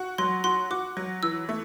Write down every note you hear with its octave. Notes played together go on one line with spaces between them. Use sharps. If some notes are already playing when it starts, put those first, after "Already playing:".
Already playing: F#4
F#3 C6
F#4 C6
F#4 D6
F#3
E3 E6
A3